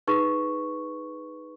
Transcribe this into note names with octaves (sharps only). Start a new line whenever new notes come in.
D#4 G#4 B4 C#6